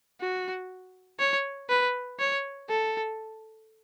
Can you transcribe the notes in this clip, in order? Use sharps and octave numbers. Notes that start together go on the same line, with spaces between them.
F#4
C#5
B4
C#5
A4